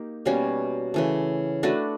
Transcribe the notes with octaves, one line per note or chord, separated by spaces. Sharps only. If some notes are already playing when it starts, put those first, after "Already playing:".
Already playing: A#3 D#4 G4
B2 G3 A#3 C#4
C#3 E3 A3
A3 D4 F#4 B4